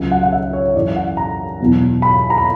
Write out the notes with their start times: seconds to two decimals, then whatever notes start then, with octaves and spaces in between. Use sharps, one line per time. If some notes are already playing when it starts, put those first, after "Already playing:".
Already playing: C#2 C#3 F#3
0.11 F#5
0.23 F#5
0.32 E5
0.53 C#5
0.75 F#2 E3 D5
0.96 F#5
1.17 A#5
1.60 E2 B2 F#3
2.02 B5
2.30 A#5
2.38 B5